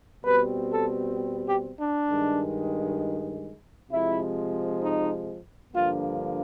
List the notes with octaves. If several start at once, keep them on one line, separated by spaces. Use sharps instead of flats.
B2 G3 C4 B4
A4
G4
D4
G2 D#3 G#3
C3 F3 G#3 E4
D#4
G2 D3 F3 A#3 F4